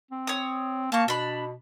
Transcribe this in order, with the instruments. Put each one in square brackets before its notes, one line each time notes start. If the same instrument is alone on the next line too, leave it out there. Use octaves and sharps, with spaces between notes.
[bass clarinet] C4
[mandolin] C#5 D#6
[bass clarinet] A#3 [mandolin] A5 C#6
[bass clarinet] B2 [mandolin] D4 B5